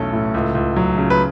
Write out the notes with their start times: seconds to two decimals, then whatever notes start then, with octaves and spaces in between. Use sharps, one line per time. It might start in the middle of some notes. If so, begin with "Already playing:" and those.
Already playing: B1 E2 A3 C#4 A4
0.13 A2
0.34 C#2
0.55 C#2
0.76 F#3
0.98 C#3
1.10 B4